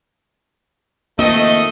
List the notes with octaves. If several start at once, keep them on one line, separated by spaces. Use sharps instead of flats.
F2 D#3 A3 A#3 D#5